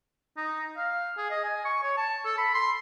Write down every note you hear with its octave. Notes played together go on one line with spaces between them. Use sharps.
D#4
F5
G#4
D#5
G#5
C#6
C#5
A5
A4
B5
C6